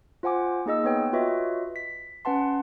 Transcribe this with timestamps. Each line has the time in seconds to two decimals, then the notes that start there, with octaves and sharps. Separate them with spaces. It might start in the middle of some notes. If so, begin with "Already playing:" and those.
0.23 F4 C5 F#5 G#5 D6
0.66 A#3 D#4 G#4 D#5 E6
0.84 B3 B4 C#5 G5
1.13 F4 F#4 B4 C#5 D#5 E5
1.76 B6
2.25 C#4 B4 F#5 A5 C6